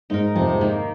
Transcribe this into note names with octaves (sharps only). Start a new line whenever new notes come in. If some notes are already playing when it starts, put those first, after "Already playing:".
G#2 D#4 A#4
F2 C3
G#2
D#3 A#3